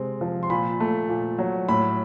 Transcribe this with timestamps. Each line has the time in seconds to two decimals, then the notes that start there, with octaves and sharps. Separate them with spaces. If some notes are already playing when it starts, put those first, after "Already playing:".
Already playing: C3 G#3 C4
0.21 F3
0.43 C6
0.50 A#2 B5
0.80 A3
1.09 A#2
1.39 F#3
1.69 A2 B5